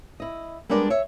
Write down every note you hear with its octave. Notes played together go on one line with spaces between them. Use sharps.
E4 D#5
G3 G#3 B3 D4 A#4 D5
C#5 E5